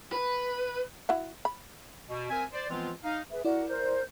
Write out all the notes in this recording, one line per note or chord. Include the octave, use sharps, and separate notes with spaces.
B4
E4 F#4 F#5
B5
B2
C4 A#4 E5 G#5
C5 D5
E3 F3 G#3 B3 C4 F4
D#4 F5
G#4 B4 E5
E4 F#4 A#4 D5 F#5
A#4 C5 G6